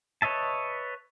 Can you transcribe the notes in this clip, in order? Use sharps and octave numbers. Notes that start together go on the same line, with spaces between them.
B4 C#5 D#5 E5 A5